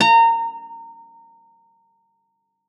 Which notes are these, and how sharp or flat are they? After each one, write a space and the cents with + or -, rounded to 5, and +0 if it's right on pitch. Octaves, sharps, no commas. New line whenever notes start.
A#5 -25